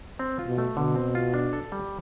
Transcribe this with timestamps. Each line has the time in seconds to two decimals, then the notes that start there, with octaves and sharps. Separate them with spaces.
0.19 C4
0.39 F4
0.47 B2
0.58 A3
0.77 B2 D3
0.96 C4
1.15 F4
1.34 D4
1.53 A4
1.72 G3